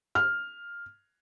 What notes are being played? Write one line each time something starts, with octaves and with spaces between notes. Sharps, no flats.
F6